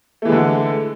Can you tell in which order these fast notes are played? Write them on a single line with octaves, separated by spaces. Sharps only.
A3 E3 G#3 D3